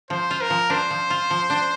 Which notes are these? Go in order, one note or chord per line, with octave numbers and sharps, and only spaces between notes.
F3 C5
F4
A#4
F3
D4 C5
F3
F4
F3
D4